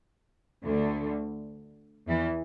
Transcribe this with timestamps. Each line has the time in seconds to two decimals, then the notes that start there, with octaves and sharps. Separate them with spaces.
0.64 D2 D3
2.07 E2 E3